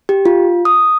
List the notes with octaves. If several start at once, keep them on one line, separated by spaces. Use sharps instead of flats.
G4
F4
D#6